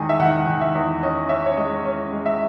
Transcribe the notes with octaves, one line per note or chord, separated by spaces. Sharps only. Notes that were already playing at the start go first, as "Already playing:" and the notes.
Already playing: E2 D#3 G#3 G#5
E5
D#3 F#5
D#3
E5
E2
C#4 D#5
C#4 E5
C#5
G#3 D#5
C#4
G#3
E5